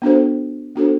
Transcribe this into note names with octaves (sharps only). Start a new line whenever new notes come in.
B3 D4 F#4 A4 C5
B3 D4 F#4 A4 C5